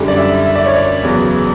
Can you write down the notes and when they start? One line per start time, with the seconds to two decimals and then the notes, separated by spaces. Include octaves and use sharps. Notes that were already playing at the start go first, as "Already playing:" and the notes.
Already playing: F#2 D3 G3
0.08 D5
0.17 E5
0.46 E5
0.55 D5
0.66 C#5
0.76 D5
1.03 E2 C#3 F#3 B3